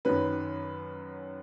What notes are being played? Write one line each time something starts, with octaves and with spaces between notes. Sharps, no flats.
F#2 D#3 F#3 C#4 B4